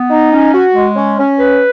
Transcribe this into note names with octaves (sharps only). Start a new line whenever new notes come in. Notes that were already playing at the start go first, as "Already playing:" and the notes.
Already playing: B3
D#4
C#4
F#4
G#3
C#4
C#4
B4